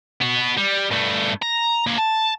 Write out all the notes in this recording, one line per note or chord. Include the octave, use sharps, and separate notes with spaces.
B3 F#4
G3
G2 A3
A#5
A#3 C#5
A5